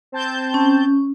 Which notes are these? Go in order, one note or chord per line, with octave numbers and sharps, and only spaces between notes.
C4 A5 G6
C#4